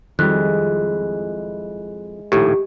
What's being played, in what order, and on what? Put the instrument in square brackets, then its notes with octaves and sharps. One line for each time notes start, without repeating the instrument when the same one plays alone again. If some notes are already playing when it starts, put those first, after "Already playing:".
[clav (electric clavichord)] F2 [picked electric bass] D#3 G3 [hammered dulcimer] G#3 E4 [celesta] F#6
[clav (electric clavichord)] A#1 D#2 A2 [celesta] G4